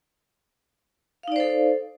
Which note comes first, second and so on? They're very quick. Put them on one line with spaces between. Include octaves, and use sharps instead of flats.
F5 D#4 D5 C5 A4